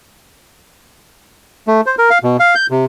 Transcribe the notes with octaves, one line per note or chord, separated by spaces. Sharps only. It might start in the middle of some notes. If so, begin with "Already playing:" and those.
A3
C5
A#4
F5
B2
F5
G6
C3